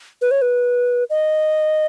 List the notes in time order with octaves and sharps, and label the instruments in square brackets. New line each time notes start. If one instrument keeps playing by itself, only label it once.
[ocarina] B4
C#5
B4
D#5